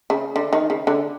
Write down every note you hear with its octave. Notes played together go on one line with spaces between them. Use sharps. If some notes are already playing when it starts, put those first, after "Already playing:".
C#3
D3
D#3
C#3
D3